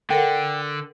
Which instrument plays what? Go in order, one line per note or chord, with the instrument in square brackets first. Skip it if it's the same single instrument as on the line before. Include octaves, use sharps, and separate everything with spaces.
[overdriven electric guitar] D3 [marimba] A4 A#4 F#5 [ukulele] G5